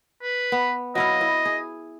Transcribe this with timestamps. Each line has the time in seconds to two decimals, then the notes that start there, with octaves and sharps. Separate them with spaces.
0.22 B4
0.52 B3
0.95 F#3 E4 D#5 F5
1.21 E4
1.45 G#4